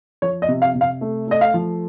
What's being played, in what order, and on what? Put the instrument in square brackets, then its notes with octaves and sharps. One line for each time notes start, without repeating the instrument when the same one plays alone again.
[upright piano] F3 C#5
D#5
C3
F5
C3
F5
A3
A3 D#5
F5
F3